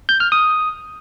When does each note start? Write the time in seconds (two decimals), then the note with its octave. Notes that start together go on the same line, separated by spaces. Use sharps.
0.09 G6
0.20 F6
0.32 D#6